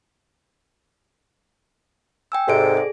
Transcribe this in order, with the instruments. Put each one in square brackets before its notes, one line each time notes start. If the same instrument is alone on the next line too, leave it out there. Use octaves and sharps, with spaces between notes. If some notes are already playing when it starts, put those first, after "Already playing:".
[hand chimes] G5 G#5 E6
[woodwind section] G#2 C3 [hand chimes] A4 D5 D7
[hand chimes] G#4